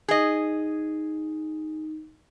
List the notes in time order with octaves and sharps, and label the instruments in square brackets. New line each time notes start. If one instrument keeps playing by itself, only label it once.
[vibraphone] D#4 [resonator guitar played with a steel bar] G#4 D#5